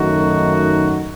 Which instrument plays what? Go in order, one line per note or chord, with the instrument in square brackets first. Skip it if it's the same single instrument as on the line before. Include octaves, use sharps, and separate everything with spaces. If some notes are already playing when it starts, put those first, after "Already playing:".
Already playing: [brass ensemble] F#2 D#3 A3 D#4 F#4